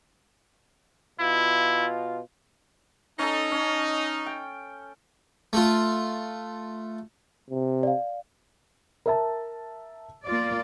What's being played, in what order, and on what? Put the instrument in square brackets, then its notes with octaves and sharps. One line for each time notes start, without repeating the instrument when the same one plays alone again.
[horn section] B2 F4 [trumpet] E4
[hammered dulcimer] C#4 A4 [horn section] D#4
[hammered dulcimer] C#4
G5
[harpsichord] A3 F4
[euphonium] C3
[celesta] D5 F5
[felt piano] A#4 E5 A5
[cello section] A#3 F4 D5